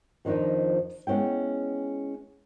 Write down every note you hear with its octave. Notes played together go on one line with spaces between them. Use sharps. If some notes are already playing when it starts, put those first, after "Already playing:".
F2 D#3 F3 D4 D#4
G#3 B3 C#4 E4 G5